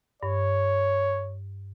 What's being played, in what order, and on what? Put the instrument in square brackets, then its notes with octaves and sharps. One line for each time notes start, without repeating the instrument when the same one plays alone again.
[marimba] G2 [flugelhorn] C#5